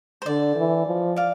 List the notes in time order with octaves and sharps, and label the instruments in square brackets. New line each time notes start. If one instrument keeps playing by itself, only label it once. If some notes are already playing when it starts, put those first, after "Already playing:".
[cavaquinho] C5
[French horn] D3 [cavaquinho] D5
[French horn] E3
F3
[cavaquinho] D5 F5